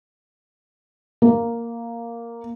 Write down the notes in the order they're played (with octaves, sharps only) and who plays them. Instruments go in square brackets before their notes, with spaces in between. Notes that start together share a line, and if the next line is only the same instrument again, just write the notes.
[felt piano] A#3